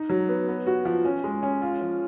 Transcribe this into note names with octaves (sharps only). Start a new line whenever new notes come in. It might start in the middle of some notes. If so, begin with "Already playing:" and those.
Already playing: D#4
F#3
B3
B3
F#4
F3
C#4
G#3
C#4
F4
F3